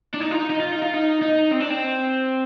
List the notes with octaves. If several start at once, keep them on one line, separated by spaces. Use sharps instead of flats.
D4
D#4
F4
D#4
D#4
F4
D#4
F4
D#4
D#4
C4
D4
C4